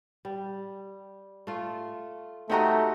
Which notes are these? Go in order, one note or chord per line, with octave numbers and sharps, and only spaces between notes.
G3
A3 F4
A3 D#4 F#4 G4 C5 D#5 A#5